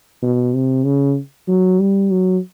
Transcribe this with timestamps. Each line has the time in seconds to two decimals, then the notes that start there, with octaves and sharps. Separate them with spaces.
0.22 B2
0.54 C3
0.84 C#3
1.48 F#3
1.79 G3
2.11 F#3